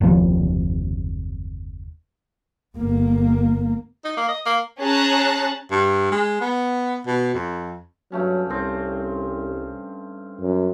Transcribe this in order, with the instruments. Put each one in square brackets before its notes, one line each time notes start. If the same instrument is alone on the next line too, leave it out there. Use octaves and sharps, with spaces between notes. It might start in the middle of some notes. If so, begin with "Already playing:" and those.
[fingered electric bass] F#1 D#2 C3 F3
[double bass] G1 A#3
[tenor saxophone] D#4
A#3
D#5
A#3
[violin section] C#4 G#4 A5 A#5 F#6
[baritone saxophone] G2
G#3
B3
B2
F2
[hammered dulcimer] G2 A3 C#4 [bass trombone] F#3
[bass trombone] C2 [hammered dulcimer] C4 C#4
[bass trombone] F#2